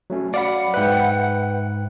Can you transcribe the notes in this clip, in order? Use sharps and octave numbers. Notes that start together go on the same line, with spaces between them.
F#3 A3 C#4
F#3 D5 F5 F#5 B5
G#2 B4 E5 G5 F#6